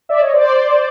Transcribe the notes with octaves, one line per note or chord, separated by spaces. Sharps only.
D5 E5
C#5 D#5
C5 D5